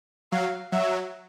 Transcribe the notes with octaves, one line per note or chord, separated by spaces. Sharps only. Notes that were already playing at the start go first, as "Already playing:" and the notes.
F#3 F5
F#3 E5